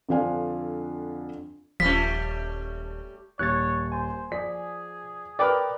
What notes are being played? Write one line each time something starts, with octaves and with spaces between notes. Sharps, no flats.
F2 D3 F3 D4 F5 G#5
D#1 F3 G3 A3 C#4 B6
D#1 C#5 F#6 A6
C5 G#5
F3 G#4 D5 B6
A#4 B4 D5 G5 D6 F6